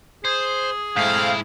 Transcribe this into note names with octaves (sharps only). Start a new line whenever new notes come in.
G#4 C5
G#2 A3 C4 E4 F5